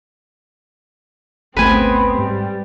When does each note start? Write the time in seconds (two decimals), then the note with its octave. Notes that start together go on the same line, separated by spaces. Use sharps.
1.57 G#1 D2 A3 B3 C4 B4 G#5
2.18 G#2 G3